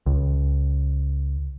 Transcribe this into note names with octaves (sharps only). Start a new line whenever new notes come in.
C#2